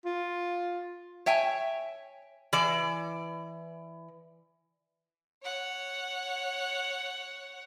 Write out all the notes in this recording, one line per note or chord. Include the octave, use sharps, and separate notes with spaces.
F4
C#5 E5 G5 G#5
E3 D5
C#5 F#5